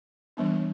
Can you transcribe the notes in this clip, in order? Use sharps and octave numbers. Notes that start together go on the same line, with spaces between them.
E3 G3 B3 D4